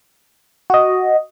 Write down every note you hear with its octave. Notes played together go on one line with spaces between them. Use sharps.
F#4 D#5